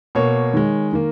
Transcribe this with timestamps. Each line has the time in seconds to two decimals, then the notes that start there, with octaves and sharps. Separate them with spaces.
0.15 B2 A#3 C#5
0.54 D#3 G#3
0.93 D#3 A#3